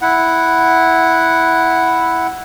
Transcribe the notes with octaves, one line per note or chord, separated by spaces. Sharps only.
E4 F#5